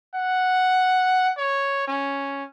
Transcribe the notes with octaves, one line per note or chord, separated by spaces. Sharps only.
F#5
C#5
C#4